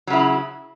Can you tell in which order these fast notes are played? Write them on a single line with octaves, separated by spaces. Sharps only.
F#3 C#3 E4